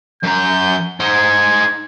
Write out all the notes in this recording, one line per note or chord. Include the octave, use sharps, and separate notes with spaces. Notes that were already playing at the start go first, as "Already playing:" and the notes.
F#2 A#5 G6
D#4 C5 G#6